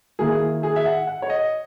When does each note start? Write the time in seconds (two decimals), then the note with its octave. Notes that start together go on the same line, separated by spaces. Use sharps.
0.19 D#3 A#3 E4 G#4
0.63 G#4
0.76 E5
0.85 F#5
1.07 F#5
1.22 C#5
1.30 D#5